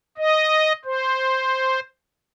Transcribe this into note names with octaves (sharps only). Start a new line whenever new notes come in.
D#5
C5